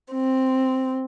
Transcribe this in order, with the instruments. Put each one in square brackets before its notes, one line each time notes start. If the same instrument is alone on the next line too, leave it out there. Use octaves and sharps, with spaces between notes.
[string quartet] C4